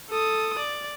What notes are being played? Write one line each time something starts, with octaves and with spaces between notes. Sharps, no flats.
A4 D#6
D5